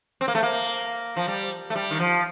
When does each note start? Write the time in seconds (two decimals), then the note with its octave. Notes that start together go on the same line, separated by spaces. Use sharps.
0.21 C4
0.28 A#3
0.35 A3
0.43 A#3
1.17 F3
1.28 G3
1.70 A3
1.75 G3
1.91 D#3
2.00 F3